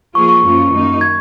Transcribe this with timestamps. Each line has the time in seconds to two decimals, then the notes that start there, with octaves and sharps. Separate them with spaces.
0.15 F3 A#3 F4 G#4 C#6
0.29 C#6
0.44 F#2 F3 A#3 C#4 F4
0.73 F#2 D#3 A#3 D#4
1.01 G#6